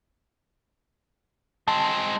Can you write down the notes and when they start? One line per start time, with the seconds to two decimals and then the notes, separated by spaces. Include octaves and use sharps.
1.68 G#3 C4 A5